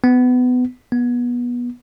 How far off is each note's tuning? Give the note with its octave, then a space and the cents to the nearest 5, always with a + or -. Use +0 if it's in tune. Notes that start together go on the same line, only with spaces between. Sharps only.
B3 +20
B3 -25